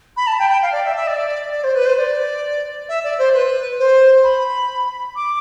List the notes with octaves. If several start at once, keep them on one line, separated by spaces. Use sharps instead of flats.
B5
A5
G5
G5
F5
D5
E5
E5
D5
D5
C5
B4
C5
D5
E5
D5
C5
B4
C5
B5
D6